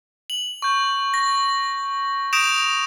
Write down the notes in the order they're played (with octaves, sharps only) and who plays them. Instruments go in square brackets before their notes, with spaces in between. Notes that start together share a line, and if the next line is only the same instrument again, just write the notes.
[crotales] F#7
C#6 G6
A#6
D#6 G6 A#6 D7 E7 F7